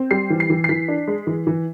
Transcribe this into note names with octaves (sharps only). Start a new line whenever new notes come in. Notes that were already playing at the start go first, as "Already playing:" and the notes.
Already playing: C4
G3 C7
E3
C7
E3
C7
E3 B6
D4
G#3
E3
E3